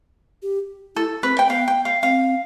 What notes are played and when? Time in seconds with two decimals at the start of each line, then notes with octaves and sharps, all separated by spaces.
0.42 G4
0.95 E4 A4
1.23 C4 B4
1.39 G5
1.49 B3 F5
1.68 G5
1.85 F5
2.02 C4 F5